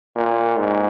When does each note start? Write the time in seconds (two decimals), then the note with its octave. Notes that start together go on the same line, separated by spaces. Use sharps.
0.16 A#2
0.59 G#2